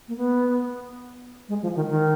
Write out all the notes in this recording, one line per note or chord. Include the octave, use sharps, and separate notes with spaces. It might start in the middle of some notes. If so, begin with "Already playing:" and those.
A#3
B3
G#3
F3
D#3
D#3